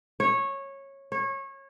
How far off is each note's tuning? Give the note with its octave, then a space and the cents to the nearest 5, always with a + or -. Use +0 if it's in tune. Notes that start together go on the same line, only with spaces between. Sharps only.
C#5 -15
C#5 -25